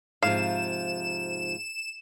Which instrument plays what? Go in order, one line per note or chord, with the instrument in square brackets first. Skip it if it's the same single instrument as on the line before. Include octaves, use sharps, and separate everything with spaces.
[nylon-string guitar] G#2 C3 F3 [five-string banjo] F5 [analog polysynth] E7